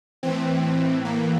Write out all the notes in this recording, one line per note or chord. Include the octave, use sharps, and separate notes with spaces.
A2 E3 C4
A#3